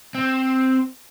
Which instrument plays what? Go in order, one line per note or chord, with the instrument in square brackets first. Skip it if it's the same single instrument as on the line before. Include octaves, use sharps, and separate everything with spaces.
[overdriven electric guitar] C4